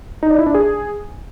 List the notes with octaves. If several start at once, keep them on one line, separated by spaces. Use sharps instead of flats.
D#4
D5
E4
D4
G#4